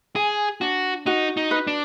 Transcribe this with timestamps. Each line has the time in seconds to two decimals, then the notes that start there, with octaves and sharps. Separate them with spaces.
0.16 G#4 G#5
0.61 D4 F#4
1.06 D#4 F#4
1.37 D#4
1.51 B4
1.67 D4